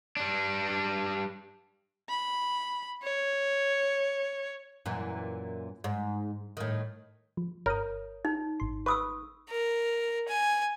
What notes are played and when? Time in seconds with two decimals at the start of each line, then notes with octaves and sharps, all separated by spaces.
0.17 G3 D4
2.09 B5
3.02 C#5
4.86 F#2 A#2 E3
5.84 G#2
6.57 A2 D#3
7.37 F3
7.66 G1 A#4 C#5 D#6
8.25 D#4
8.60 G#1 C6
8.86 B4 C#6 D#6 E6
9.49 A#4
10.28 G#5